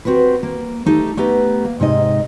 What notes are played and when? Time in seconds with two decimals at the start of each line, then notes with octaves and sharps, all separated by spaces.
0.05 C4 F#4 G4 B4
0.43 A#3
0.86 A3 D#4 G4 A4
1.17 A3 B3 G4 B4 A#5
1.65 A#3
1.80 G#2 C3 D#4 D#5